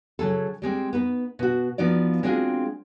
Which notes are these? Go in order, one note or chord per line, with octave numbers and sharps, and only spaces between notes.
C#3 F#3 G#4 A4
G3 G#3 C4
B3 D#4 B4
B2 F#4
F3 B3 D#4 F#4 D5
G#3 C4 D4 F4 F#4 G#4